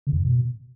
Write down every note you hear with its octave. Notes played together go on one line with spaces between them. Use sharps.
C#3
E2
G2
B2